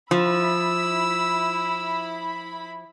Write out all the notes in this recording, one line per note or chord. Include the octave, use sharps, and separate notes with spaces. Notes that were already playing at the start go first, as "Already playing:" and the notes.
F3 E4 B5 E6